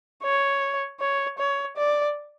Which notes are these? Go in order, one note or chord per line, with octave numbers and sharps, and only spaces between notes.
C#5
C#5
C#5
D5